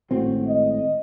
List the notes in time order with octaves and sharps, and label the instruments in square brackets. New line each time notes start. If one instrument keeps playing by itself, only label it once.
[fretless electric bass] G#1 A2 C4 [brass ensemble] F#4
[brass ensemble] D#5